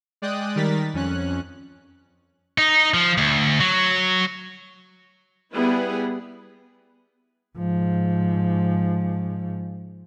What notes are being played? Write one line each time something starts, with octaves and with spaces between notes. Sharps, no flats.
G#3 D5 G5 D#6 F#6
D#3 G3 A#4 A6 B6
F2 C#4 F#6
D#4
F3
D2
F#3
G3 B3 E4 G#4 B4
G#2 F3